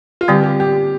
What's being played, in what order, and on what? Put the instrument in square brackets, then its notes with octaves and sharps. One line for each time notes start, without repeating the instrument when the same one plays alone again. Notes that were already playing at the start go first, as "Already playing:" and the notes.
[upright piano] F4
[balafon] D3 G3 C4 [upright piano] G4
[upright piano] G4
G4